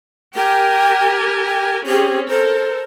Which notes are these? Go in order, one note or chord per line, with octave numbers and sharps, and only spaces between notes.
G4 A#4 G5 G#5
G5
C4 C#4 G4 G#4
A4 A#4 C5